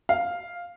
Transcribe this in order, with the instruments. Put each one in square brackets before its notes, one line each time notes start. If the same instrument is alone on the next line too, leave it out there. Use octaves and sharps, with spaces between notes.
[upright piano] F5